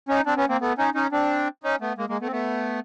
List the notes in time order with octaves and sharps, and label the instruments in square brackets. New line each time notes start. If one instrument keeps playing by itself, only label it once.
[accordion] C#4 D#4
C4 D4
B3 C#4
A#3 C4
A3 B3
C#4 D#4
C#4 D#4
C4 D4
C#4 D#4
A3 B3
G#3 A#3
G#3 A#3
A3 B3
C4
A3 B3